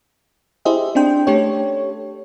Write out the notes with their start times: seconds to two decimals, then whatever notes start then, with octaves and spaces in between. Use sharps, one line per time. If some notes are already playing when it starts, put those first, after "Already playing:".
0.65 E4 G4 G#4 C5 D#5 E5
0.95 C4 D4 G5 C6
1.27 A3 C#4 D4 G4 A4 C#5